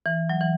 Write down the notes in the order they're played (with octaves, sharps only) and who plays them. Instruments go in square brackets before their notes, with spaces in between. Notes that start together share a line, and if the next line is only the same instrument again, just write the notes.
[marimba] E3
F#3
E3